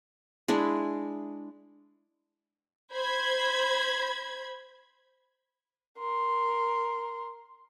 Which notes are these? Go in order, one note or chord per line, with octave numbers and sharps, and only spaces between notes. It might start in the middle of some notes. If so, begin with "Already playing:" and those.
G#3 D4 E4
C5 B5 G#6
A#4 C6